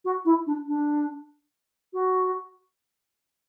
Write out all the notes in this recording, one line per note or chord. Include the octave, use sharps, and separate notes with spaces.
F#4
E4
D4
D4
F#4